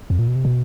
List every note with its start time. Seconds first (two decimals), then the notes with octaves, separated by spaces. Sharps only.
0.10 F2
0.19 A#2
0.28 B2
0.35 C3
0.45 B2